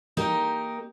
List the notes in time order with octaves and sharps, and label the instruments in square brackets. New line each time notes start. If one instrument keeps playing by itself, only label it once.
[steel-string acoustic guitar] A#3 D#4 G4 A#4